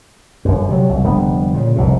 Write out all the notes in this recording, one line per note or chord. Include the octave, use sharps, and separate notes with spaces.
G1 F#2
C3 F3 F#3
C2
F1 D3 G3 B3
A#2 C#3
F1 C2 C3